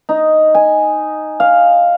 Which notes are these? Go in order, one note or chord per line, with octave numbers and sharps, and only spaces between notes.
D#4
G#5
F5